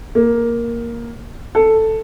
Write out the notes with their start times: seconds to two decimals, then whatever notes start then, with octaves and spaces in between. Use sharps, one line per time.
0.15 A#3
1.55 A4